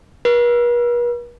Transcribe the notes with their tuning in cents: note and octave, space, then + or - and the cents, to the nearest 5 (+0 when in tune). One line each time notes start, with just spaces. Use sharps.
B4 -45